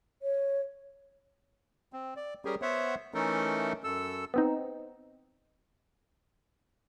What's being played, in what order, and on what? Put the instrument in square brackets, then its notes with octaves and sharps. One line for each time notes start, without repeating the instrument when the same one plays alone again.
[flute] C#5
[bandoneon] C4
D5
G3 C#4 G4 G#4 A#4
B3 C5 C#5 E5 F#5
E3 A3 C#4 D#4 A4 A#4
F#2 A4 E6
[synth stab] B3 C4 D#4